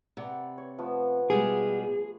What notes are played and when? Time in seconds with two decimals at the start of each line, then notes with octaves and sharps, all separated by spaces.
0.17 C3 D5 F#5 B5
0.58 C#5
0.78 F3 A3 B3
1.30 B2 G3 G#3 G#4